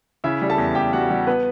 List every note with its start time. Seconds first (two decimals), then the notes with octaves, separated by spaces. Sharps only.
0.24 C#3 E4 E5
0.42 G3
0.50 A4 A5
0.58 E2
0.75 E2 G4 G5
0.93 G3 F#4 F#5
1.10 G3
1.27 B3 B4